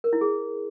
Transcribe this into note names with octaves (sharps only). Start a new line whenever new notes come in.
A#4
E4
G#4